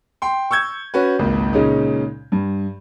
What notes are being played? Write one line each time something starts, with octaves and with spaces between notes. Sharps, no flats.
G5 C6
C#6 E6 G6 G#6
C#4 F#4 B4
G#1 C#2 A#3
A#2 C#3 G#3 C#4 D#4
G2